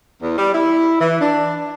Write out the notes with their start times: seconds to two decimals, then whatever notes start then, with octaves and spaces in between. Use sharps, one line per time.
0.21 E2
0.38 G3
0.54 E4
1.00 E3
1.20 D4